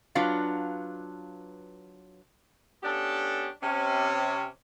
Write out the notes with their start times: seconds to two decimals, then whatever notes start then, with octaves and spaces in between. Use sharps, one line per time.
0.15 F#3 D4 F4 B4 F5
2.83 B3 C#4 D4 G4 A4
3.62 C3 C#4